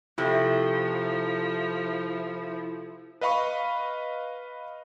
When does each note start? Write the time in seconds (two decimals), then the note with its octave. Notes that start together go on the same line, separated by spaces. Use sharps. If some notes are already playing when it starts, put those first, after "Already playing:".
0.18 C3 F3 A3 E4
3.21 B4 D#5 F5 B5 C#6